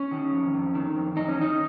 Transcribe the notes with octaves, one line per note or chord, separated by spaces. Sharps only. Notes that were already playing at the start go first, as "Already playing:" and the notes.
Already playing: C#4
D#3
F2
F2
D#3
F2
F2 D#4
C#4
D#3 D#4